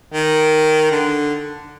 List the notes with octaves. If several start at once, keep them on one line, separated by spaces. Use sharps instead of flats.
D#3
D3